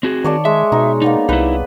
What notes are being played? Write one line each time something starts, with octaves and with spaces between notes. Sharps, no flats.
C4 F#4 G#4
D#3 C#5 D5 A5
G#3 E5
B2 D#4
A#3 B3 D#4 D5
C2 D#4 E4 B4